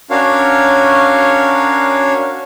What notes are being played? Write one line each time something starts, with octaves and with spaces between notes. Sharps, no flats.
C#4 D4 F#4 A#4 C#5 F5